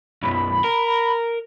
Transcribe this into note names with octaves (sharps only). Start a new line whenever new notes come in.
B1 F#2 B5
A#4